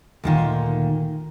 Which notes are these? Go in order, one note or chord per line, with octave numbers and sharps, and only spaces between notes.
D2 A#2 D#3